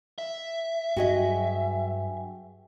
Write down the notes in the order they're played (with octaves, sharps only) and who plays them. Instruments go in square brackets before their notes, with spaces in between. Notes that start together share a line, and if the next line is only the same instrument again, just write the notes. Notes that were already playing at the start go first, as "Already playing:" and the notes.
[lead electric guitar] E5
[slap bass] G2 [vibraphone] F#3 G5 G#5 [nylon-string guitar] F#4 G#4 D#5